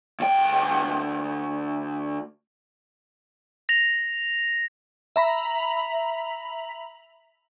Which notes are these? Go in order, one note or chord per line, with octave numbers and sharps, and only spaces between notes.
D2 G5
A#6 F7
E5 A#5 B5